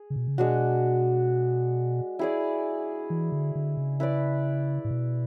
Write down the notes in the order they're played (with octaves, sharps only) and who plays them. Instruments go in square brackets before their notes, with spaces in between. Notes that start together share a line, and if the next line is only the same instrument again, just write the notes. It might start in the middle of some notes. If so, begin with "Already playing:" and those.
Already playing: [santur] G#4
[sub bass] C#3
B2
C#3
[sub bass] B2 [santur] G#3 D4 F#4
[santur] E4 G#4 D5
[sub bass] E3
D3
D3
C#3
[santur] E4 B4 D5
[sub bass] A2
B2